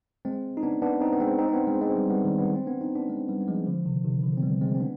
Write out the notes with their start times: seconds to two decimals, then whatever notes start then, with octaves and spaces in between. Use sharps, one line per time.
0.25 G#3 C4
0.57 D#4
0.63 B3 D4
0.82 B3 D4
1.01 C4 D#4
1.13 B3
1.20 G#3 C4
1.39 C4 D#4
1.49 C4
1.53 B3 D4
1.67 G#3 C4
1.81 G#3 C4
1.96 G3 B3
2.10 G3 B3
2.24 D#3 G3
2.38 G3 B3
2.55 C4
2.67 B3 D4
2.81 C4 D#4
2.95 B3 D4
3.10 G#3 C4
3.29 G3 B3
3.41 B3
3.48 F3 G#3
3.67 D3 F3
3.86 C3 D#3
4.04 C3 D#3
4.23 D3 F3
4.37 C4
4.42 G3 B3
4.61 G#3 C4
4.75 C4
4.80 B3 D4